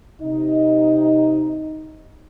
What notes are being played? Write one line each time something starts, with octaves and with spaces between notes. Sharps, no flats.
C3 D#4 D#5